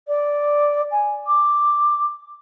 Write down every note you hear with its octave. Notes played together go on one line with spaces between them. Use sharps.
D5
G#5
D6